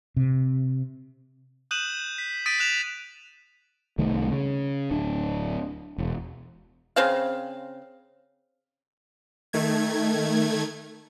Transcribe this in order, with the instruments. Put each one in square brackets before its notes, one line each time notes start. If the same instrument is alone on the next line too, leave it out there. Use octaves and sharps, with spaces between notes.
[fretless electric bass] C3
[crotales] D#6 F#6 G6 D#7 E7 F#7
B6
D#6 A6 B6 D7 D#7
F#6 E7 F7
[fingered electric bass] C2 D#3 A3
C#3
D1 D4
E1
[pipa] C#3 C4 F5
[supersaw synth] D#3 A3 G#6